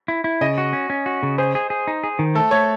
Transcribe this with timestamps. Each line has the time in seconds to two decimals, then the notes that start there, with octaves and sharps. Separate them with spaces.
0.08 E4
0.24 E4
0.41 C#3 D#5
0.58 F#4
0.73 C#4
0.90 C#4
1.06 F#4
1.23 C#3
1.38 G#4 C5
1.55 G#4
1.70 G#4
1.87 D#4
2.04 G#4
2.19 D#3
2.35 A3 A4
2.51 A3 C#5